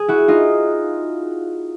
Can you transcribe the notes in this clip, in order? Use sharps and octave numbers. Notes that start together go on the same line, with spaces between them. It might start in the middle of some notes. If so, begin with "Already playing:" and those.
Already playing: G#4
E4 F#4
D#4 F4